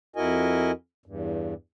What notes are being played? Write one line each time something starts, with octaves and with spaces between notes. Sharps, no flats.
F2 E4 F#4 A#4 D#5 G#5
E2 G2